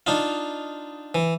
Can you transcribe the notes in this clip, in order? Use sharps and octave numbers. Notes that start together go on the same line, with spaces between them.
D4 D#4 F4
E3